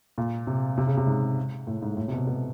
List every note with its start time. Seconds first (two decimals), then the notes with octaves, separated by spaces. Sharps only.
0.18 A#2
0.47 C3
0.78 C3
0.87 C#3
0.97 C3
1.07 G#2
1.67 A2
1.82 G#2
1.97 A2
2.08 C3
2.12 B2
2.27 B2